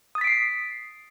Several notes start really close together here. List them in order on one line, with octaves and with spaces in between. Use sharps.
D#6 A6 B6 D7 C7